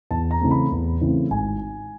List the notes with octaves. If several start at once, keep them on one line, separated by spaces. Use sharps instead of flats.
E2 A5
A#5
C#3 E3 A3 C4
B5
E2
C#3 E3 A3 C4
G#1 G#5